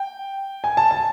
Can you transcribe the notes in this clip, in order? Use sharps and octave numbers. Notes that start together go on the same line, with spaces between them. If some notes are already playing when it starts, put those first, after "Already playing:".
Already playing: G5
G#5
A5
A5